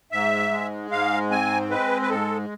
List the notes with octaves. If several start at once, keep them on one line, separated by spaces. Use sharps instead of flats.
G#2 E5
G#3
G#2 F5
C4 G#5
G#3 B4
B4
G#2 A4